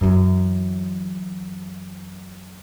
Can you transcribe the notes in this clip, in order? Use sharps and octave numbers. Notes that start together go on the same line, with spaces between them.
F#2 E3